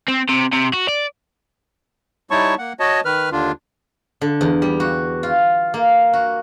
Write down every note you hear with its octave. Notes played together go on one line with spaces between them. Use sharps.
C4
C3
C3
F#4
D5
G3 D#4 E4 C#5 A5 C#6
A#3 F#5
F#4 C#5 D#5 A5
D#3 B4 F6
D#2 D3 D4 F4
D3
E2
G3
F#4
F4
A#3
F#4